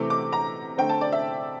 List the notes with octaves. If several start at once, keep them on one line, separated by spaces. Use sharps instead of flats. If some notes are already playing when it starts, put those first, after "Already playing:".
Already playing: C3 E3 A3 C4 D6
D6
A#5
D3 A3 C4 G5
A5
D5
E5